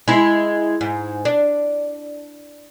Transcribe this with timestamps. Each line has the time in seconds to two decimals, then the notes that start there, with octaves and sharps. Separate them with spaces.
0.08 G#3 E4
0.81 G#2
1.25 D4